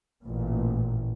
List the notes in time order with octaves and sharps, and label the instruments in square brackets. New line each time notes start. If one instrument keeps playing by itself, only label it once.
[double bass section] A1 A#2